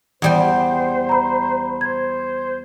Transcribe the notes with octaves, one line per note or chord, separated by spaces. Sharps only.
E2 G3 C5 G5
A#5 B5
C5 G#6